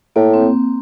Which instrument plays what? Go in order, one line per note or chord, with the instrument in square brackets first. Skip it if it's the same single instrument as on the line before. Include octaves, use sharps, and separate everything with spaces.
[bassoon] A2 [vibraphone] A#3
[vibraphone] C4